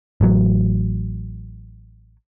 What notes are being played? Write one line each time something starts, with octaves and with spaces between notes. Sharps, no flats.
A1 F#3